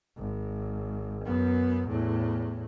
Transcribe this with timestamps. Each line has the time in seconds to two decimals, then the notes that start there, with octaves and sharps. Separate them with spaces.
0.17 G#1
1.25 F#2 B3
1.88 E2 A2